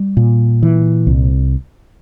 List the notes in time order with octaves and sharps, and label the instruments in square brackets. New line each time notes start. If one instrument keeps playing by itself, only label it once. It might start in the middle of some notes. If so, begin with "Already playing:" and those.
Already playing: [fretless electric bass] G3
A#2
E3
C2